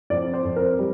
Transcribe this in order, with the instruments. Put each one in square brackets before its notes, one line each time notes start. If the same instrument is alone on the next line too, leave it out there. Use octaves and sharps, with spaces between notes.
[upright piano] F2 D5
C5
F2
A#4
G3